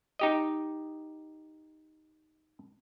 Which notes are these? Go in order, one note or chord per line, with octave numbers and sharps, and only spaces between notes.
D#4 G4 D#5